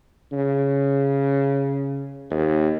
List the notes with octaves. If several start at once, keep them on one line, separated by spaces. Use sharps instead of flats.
C#3
D#2